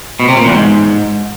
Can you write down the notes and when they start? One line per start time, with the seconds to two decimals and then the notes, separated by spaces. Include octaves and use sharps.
0.20 B2
0.28 C3
0.37 A#2
0.46 E2
0.55 G#2